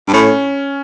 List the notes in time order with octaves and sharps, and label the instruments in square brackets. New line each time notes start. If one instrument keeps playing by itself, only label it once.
[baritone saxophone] G2
[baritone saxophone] A2 [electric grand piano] C#4